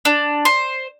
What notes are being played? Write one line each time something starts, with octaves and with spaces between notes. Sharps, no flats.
D4
C5